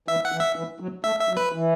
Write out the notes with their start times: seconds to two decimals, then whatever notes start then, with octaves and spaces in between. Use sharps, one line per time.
0.08 E3 E5
0.25 F#5
0.32 E3
0.40 E5
0.56 E3
0.80 F#3
1.04 A3 E5
1.20 E5
1.29 F#3
1.37 B4
1.52 E3